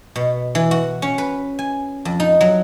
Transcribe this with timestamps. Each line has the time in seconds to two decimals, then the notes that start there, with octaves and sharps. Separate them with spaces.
0.16 B2
0.55 E3
0.71 F#4
1.02 C#4
1.18 B4
1.59 G#5
2.05 F2
2.20 D#4
2.41 F#3